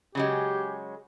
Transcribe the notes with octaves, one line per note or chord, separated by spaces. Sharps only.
C#3 F#3 G#3 G4